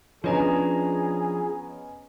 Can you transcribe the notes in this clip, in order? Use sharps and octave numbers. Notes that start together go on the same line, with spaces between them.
F3 B3 C#4 D4 G#4 C#5 D#5 A#5